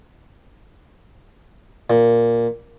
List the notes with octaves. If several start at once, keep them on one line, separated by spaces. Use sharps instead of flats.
A#2